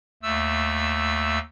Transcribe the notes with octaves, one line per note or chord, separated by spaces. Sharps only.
D#2 A3 E6